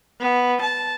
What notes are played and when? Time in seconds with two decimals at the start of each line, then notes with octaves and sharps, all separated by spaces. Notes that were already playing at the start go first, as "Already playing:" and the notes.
0.20 B3
0.61 A5